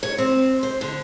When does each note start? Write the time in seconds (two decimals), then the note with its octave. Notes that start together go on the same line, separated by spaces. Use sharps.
0.03 C#5
0.18 C4
0.63 C5
0.81 D3